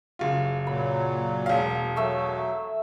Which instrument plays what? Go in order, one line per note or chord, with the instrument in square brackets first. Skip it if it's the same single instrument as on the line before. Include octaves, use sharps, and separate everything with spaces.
[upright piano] F#1 F4
[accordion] A#2 F#3 [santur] B5
[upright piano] E1 F5
[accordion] F#3 [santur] A3 E5